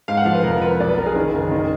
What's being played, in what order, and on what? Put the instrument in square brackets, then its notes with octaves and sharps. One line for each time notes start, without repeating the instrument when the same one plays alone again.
[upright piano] G#2 F5
F#5
F3 F5
B4
F1 A#4
F3 B4
B1 D5
B4
B1 A#4
G#4
D#3
F#1
D#3